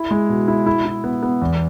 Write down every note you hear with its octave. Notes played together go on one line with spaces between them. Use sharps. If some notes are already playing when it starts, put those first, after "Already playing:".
Already playing: E4
G#3
B2
E4
E4
E4
B3
B3
E2